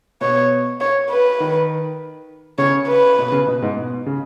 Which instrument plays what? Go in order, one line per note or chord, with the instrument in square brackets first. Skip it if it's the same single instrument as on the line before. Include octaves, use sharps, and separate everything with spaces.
[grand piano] B2 [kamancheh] C#5
[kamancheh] C#5
B4
[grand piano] D#3
[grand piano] C#3 [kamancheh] C#5
[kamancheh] B4
[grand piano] B2
C#3
B2
G#2
B2
C#3